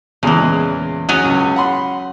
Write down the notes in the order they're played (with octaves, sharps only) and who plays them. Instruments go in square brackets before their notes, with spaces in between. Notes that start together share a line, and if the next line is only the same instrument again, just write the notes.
[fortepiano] E2 A#2 G#3 [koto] C#3 E3
[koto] F#3 C#4 G#4
[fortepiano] C#2
F#5 B5 C6